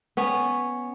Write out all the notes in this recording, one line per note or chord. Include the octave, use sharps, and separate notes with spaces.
B3 C#4